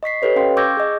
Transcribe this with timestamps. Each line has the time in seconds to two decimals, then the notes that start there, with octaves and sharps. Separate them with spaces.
0.03 D#5 C#6 B6 C7
0.21 G4 A4 B4 C#5 D#5
0.36 C#4 F5 G5 C6
0.57 C#6 D6 E6 G6 G#6 A#6
0.77 G#4 D#5